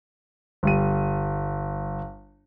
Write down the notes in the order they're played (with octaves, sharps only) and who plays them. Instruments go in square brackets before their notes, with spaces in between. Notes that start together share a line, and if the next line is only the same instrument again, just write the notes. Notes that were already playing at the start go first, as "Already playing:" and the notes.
[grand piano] G1 G3 D#7